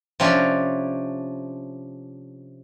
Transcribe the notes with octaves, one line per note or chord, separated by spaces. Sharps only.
C3 F3 C#4 D4